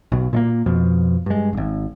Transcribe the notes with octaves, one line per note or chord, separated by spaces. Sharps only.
B1 B2
A#2 A3 A#3
F2 B2 F3
G2 G#3
D1 G#1